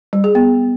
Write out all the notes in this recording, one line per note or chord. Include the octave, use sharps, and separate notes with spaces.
G3
G#4
B3